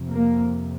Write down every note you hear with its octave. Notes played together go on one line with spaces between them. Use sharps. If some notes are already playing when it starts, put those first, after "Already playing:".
Already playing: F2 C3
A#3